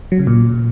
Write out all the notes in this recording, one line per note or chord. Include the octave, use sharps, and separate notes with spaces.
F#3
C#3
A#2